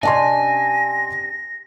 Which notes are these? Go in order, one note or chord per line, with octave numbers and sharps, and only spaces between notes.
C3 C#4 D4 D#5 G#5 A5 C6 A#6